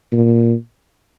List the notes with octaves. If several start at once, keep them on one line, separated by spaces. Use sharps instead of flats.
A#2